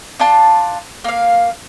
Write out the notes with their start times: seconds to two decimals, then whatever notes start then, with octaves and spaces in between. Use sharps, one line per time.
0.19 D4 F4 A5
1.04 A#3 F5